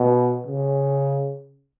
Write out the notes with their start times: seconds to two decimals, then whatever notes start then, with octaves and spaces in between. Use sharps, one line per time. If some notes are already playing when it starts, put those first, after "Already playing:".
Already playing: B2
0.47 C#3